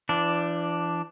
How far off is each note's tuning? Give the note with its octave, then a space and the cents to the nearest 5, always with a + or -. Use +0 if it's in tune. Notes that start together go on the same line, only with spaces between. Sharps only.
E3 +45 D4 +0